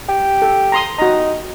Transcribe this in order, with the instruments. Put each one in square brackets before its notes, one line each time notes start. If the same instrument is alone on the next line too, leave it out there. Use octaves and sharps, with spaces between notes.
[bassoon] G4
[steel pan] A4
A#5 C6 D#6
[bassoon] D#4 [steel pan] F#4 A#5